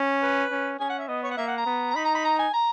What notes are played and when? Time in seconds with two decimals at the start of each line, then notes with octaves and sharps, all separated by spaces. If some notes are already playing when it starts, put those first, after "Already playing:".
Already playing: C#4
0.22 B4
0.51 C#4
0.80 C#4 G#5
0.90 F#5
0.99 E5
1.08 B3 D#5
1.23 C#5
1.31 F#5
1.37 A#3 E5
1.47 F#5
1.57 A#5
1.66 B3
1.91 A#5
1.95 D#4 B5
2.05 A#5
2.15 B5
2.24 A#5
2.39 G#5
2.53 A#5